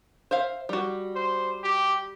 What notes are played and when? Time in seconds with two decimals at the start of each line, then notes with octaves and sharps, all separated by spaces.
0.31 C5 E5 F5
0.69 G3 F#4
1.16 C5
1.63 G4